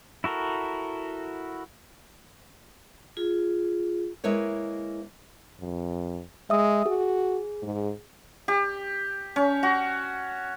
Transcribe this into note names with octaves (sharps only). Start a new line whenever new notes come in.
E4 F#4 A4 A#4
F4 G#4
G#3 A#3 E4 B4 C#5
F2
G#3 E5 D#6
F#4 G#4
G#2
G4
C#4
F#4